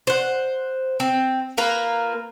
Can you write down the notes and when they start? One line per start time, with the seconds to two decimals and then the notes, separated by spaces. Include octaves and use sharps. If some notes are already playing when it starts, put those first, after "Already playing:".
0.07 C5 F#5
1.00 C4
1.58 A#3 F4 A#4 B4